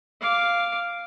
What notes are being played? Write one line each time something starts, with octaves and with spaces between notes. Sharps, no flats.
F5 D6